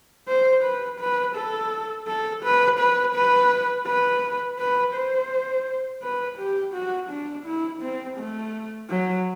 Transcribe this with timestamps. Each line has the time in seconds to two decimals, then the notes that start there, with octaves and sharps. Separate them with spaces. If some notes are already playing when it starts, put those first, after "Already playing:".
0.28 C5
0.64 B4
1.00 B4
1.35 A4
2.08 A4
2.43 B4
2.79 B4
3.15 B4
3.87 B4
4.59 B4
4.95 C5
6.02 B4
6.38 G4
6.74 F#4
7.10 D4
7.46 E4
7.82 C4
8.18 A3
8.90 F#3